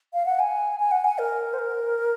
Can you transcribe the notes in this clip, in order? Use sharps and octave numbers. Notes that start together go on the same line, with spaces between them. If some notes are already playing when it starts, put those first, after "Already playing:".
F5
F#5
G#5
G#5
F#5
G#5
A#4
C5
A#4